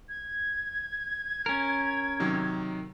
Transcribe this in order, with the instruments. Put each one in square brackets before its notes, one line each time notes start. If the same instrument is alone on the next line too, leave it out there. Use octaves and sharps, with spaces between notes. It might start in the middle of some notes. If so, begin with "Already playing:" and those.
[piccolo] G#6
[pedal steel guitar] C#4 A#4
[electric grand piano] C3 D#3 F#3